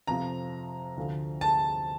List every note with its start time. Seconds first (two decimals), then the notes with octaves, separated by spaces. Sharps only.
0.07 F2 C3 F3 A#5
0.97 D2 D3 F3
1.41 A5